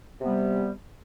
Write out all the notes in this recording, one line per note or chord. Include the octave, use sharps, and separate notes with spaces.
C3 G3 B3